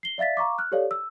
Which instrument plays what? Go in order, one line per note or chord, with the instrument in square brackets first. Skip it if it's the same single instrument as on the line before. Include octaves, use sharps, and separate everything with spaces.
[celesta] C7 G7
D5 E5 F5 A6 B6
F5 A#5 C#6 D6
F6 F#6
G4 A4 C#5 D5 F5
E6